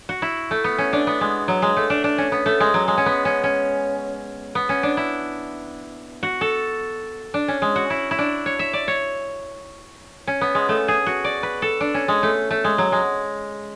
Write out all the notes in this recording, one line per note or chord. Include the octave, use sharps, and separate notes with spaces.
F#4
E4
A3
B3
C#4
D4
B3
G#3
F#3
G#3
A3
D4
D4
C#4
B3
A3
G#3
F#3
G#3
C#4
B3
C#4
C#4
B3
C#4
D4
E4
F#4
A4
D4
C#4
G#3
F#4
E4
E4
D4
C#5
E5
D5
C#5
C#4
B3
G#3
A3
G#4
F#4
D5
B4
A4
D4
C#4
G#3
A3
A3
G#3
F#3
G#3